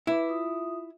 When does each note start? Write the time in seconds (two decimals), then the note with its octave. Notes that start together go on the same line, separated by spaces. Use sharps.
0.07 E4 B4 D6
0.29 F4 E5 D#6